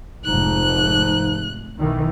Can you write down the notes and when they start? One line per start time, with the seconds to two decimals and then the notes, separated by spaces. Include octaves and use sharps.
0.25 F1 G#2 F3 D#4 F#6
1.77 B1 D#3 E3